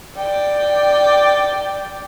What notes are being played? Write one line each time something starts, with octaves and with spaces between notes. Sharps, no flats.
D5 G5